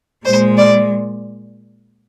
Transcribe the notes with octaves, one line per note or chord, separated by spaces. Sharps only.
A#2 G#3 C5
D5